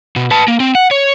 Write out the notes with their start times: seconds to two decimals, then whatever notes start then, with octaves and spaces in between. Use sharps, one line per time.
0.16 B2
0.31 B4 A5
0.48 A#3
0.60 C4
0.75 F#5
0.91 C#5